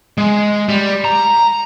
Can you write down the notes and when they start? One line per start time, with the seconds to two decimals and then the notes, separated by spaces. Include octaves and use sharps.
0.18 G#3
0.69 G3
1.05 A#5